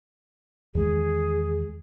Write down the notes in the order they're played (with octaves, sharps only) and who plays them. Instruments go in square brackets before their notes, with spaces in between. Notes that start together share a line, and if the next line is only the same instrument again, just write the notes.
[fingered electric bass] E2 D#3 G#3 [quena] G#4